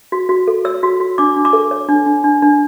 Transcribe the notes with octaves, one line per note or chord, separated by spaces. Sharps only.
F#4
F#4
A4
C#5 E6
F#4
F#4
D4 D6
D4
D6
A4
C#5
D4
D4
D4
D4